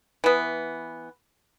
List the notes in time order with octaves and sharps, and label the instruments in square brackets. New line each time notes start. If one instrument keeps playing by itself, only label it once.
[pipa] E3 B3